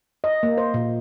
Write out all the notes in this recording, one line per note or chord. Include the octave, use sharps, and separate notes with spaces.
D#5
A#3
C5
A#2